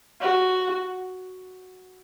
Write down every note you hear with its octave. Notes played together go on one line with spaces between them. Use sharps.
F#4